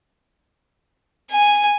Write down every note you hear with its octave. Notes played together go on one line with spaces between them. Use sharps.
G#5